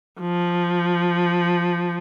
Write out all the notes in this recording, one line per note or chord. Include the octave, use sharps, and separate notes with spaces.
F3